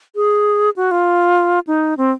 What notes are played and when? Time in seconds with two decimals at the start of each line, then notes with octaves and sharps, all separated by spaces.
0.16 G#4
0.76 F#4
0.91 F4
1.67 D#4
1.97 C4